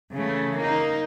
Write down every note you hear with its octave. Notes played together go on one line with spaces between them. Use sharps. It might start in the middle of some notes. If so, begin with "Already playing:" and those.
C#3 E3 A3
A#3 D#4